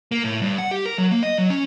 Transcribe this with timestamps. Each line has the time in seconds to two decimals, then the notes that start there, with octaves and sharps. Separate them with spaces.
0.12 A#3
0.24 A2
0.42 G2
0.58 F#5
0.71 G4
0.86 A#4
0.98 F#3
1.12 A#3
1.23 D#5
1.38 F#3
1.50 C#4